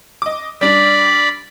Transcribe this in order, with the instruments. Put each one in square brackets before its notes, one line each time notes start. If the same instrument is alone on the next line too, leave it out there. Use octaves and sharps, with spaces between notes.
[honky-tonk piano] D#5 D6
[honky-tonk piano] G3 D4 [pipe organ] D5 B5